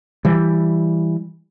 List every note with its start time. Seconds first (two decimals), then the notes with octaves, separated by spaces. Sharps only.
0.25 E3 G3